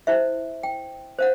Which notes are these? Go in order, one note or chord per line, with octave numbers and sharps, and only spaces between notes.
E4 C5 E5
G5
C5 F5 F#5